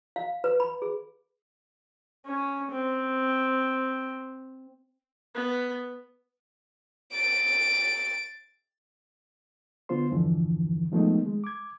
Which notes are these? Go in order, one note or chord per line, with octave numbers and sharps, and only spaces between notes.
F5
B4
B5
G#4
C#4
C4
B3
A6 D7
D3 B3 F4 C5 C6
E2 G2 D3 E3 F3
D#3 F3 G#3 A3 B3 D#4
G#3
D6 G#6